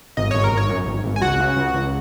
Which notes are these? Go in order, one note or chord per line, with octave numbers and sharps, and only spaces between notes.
G#1 D#5
G#1 C#5
A#4
G#1
C#5
F#2
G#1
G#1
G#5
C#2 F#4 F#5
C#3
C#2
C#2